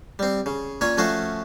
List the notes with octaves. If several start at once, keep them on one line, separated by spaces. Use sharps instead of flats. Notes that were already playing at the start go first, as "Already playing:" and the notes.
G3 C4
C#3
A#2 C#4 C#5
F3 A3 C#4 F#4 C5